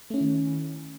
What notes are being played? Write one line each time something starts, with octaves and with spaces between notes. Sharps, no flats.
D#3 A3 C#4 E4